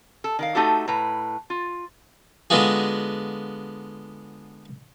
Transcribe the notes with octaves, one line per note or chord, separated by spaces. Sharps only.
A4
D#3 A#4 F5
A3 D#4 F#4 G4 A4
A2 B4 A#5
F4
D3 G#3 B3 F4 F#4 G#4